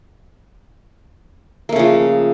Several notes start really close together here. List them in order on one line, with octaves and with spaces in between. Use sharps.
A#3 A3 C#3 F3